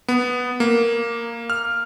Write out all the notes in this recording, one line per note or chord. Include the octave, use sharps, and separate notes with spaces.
B3
A#3
F6